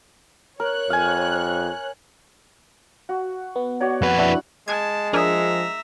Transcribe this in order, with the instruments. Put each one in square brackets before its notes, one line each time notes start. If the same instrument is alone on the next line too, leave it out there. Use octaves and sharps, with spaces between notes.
[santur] A#4 [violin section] C#5 F#6
[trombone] F2 [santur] F5 G#5
[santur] F#4
[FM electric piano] B3
[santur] F#4 C#5 D5
[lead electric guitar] F2 B4 [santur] F#5
[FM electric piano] D4 E4 F#4
[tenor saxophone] G#3 [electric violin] A5 [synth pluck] G#6
[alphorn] F3 [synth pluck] D4 G#4 A#4 [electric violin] E5 A#5